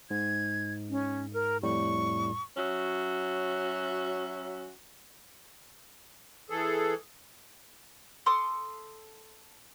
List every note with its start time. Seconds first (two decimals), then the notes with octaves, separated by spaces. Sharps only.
0.10 G#2 G#6
0.90 C#4
1.33 A#4
1.63 F2 A2 G3 C#6
2.57 F#3 C#4 F#4 E5
6.50 E3 G#4 A4
8.26 A4 C6 D6 D#6